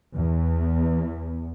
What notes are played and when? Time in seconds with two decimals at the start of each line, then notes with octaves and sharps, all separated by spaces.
0.14 E2